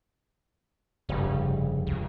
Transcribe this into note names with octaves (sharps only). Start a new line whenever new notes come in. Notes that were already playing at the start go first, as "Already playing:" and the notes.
F1 G2 C#3 G3
C#2